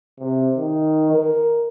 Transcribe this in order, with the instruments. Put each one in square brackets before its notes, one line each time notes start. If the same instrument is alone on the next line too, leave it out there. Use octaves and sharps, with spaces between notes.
[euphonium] C3
D#3
A#4